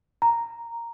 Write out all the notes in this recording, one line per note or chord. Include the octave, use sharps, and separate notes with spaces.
A#5